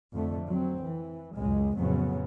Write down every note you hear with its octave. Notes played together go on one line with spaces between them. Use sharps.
F2 D3 A3
F#3 C4
E3
C#2 F#2 G#3
F2 A2 C#3 F#3 B3